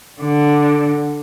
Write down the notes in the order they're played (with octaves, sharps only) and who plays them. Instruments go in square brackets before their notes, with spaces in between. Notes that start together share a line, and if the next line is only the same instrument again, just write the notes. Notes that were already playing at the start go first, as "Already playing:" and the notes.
[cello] D3